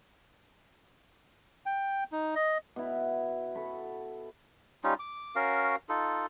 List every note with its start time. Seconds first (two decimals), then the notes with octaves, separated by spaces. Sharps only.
1.66 G5
2.12 D#4
2.36 D#5
2.76 B2 E4
3.55 A4 B5 C#6
4.84 G3 C#4 D#4 F4
4.99 D6
5.35 C#4 F#4 A#4 F5
5.89 D#4 F4 A4